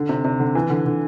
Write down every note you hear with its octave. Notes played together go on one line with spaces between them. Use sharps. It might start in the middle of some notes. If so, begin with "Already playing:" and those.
Already playing: D3
C3
C3
D3
E3
D3
D3